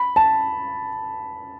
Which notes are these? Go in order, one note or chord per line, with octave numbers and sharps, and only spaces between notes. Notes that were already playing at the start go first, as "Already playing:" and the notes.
Already playing: B5
A5